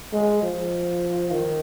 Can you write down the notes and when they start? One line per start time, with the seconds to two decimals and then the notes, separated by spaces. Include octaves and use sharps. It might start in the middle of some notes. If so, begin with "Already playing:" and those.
0.13 G#3
0.43 F3
1.31 D#3